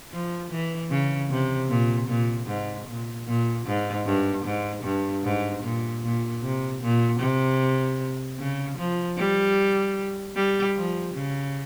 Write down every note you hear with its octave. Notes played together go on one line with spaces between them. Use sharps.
F3
E3
C#3
C3
A#2
A#2
G#2
A#2
A#2
G#2
G2
G#2
G2
G#2
A#2
A#2
C3
A#2
C3
C#3
F3
G3
G3
F3
C#3